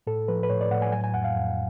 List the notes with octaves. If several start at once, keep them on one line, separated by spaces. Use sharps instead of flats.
A2 A4
F3 B4
B4
A2 C#5
D5
A2 F#5
G#5
F#3 G#5
G#5
F2 F#5
F5
F2